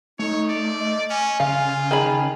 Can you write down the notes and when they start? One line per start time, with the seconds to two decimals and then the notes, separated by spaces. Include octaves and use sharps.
0.19 A3 D#4 C#5
0.50 D5
0.79 D#5
1.10 C#4 G#5
1.40 C#3 F4 F5
1.91 D#3 G#4 B5